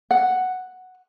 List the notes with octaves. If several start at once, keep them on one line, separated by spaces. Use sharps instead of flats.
F#5